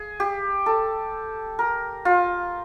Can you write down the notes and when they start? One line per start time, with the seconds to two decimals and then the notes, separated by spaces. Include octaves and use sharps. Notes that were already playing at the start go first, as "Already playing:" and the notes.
Already playing: G#4
0.20 G4
0.66 A4
1.59 A#4
2.05 F4